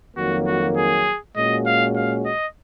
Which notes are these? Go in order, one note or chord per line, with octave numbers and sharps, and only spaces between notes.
F2 D#3 F#3 A#3 F#4
F#4
G#4
A#2 G#3 C#4 F#4 D#5
F5
F5
D#5